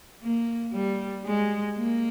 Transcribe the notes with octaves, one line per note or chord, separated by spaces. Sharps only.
A#3
G3
G#3
A#3